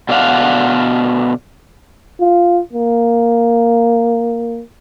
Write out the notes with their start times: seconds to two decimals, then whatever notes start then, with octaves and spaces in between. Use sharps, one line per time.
0.09 B2 D3 D5 F5 F#5
2.20 F4
2.73 A#3